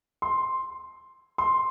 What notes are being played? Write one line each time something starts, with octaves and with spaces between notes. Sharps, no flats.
C6
C6